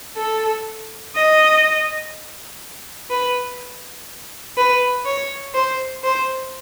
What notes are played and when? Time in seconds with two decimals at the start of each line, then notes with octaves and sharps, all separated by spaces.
0.17 A4
1.15 D#5
3.10 B4
4.57 B4
5.06 C#5
5.55 C5
6.04 C5